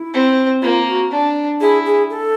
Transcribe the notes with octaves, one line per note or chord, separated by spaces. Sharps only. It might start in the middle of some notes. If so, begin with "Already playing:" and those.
Already playing: E4
C4
A#3 F4
F#4
D4
E4 G#4
G#4
A4